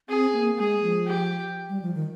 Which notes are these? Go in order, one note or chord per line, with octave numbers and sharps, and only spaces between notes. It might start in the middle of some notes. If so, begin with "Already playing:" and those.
C4 G#4
A#3
G#3 G#4
F3
G4
G3
F3
D#3